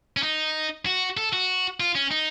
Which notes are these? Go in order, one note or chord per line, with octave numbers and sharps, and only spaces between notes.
C#4
D#4
F#4
A4
F#4
F4
C#4
D#4